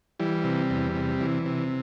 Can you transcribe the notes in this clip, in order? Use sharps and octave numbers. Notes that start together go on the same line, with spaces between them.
E3 G3
C3
E2
C3
E3
C3